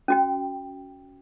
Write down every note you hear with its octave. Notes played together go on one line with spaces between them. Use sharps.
C#4 F#4 G5